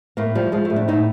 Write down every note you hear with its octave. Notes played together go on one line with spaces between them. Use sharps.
A2 A#3
F3 G3
F3 G#3
A3
A2
D4
A2 D#4